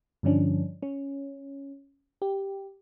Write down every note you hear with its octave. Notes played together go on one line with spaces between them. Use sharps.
G2 D3 F3 C#4 D4
C#4
G4